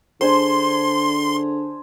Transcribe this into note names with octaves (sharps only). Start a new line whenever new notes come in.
D3 D4 G#4 C5 C6